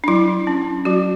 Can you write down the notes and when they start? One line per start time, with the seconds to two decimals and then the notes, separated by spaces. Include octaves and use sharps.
0.04 D4
0.08 F#3 E4
0.47 C#4
0.85 F#3 F#4